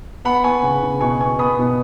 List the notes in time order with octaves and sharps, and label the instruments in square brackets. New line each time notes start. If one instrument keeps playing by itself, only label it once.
[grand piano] B3 F#5 B5
B3 G#5 C#6
C#3
C#3
B2 G#5 C#6
B3 G#5 C#6
B3 B5 D#6
B2